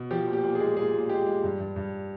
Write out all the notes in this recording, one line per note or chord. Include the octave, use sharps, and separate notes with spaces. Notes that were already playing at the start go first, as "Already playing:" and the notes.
Already playing: B2
F3 G4
A#2
G4
A#2
G#4
G#3
A#2 G#4
A#2
G#3 G4
G#3
G2
G2
G2